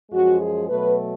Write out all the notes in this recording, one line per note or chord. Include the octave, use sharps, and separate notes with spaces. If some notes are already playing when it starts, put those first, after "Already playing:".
F#2 F3 G#3 F#4
G#4
B2 F#3 A3 B4